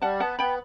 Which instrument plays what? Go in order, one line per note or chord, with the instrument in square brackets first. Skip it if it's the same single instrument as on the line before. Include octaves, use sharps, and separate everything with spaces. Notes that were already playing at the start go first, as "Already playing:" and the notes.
[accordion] G3 [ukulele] F#5 A5
[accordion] B3 [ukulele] F#5 A5
[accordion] B3 [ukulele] G5 B5